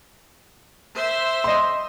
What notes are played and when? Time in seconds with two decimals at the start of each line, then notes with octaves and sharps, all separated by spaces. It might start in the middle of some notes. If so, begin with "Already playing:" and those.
0.95 C5 E5
1.44 D#5 C6